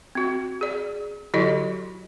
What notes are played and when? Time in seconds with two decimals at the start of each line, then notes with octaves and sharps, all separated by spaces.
0.15 C4 F#4
0.61 G#4 D5
1.34 D3 F#3 E4 F#4 G4 D#5